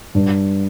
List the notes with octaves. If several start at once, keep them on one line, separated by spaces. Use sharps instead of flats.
G2